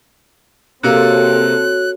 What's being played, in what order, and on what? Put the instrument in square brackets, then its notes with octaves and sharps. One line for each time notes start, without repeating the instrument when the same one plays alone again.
[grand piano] C3 A#3 [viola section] C4 A4 [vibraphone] F#4 C#5 [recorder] F#6